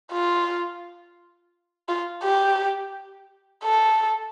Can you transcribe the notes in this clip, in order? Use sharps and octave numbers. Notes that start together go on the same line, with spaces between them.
F4
F4
G4
A4